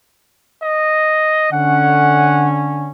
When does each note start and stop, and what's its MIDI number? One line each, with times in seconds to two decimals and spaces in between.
0.63 1.51 75
1.52 2.91 50
1.52 2.91 61
1.52 2.53 78